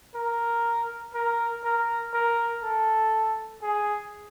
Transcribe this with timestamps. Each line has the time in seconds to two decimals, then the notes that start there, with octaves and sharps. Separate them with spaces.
0.15 A#4
1.14 A#4
1.64 A#4
2.14 A#4
2.63 A4
3.62 G#4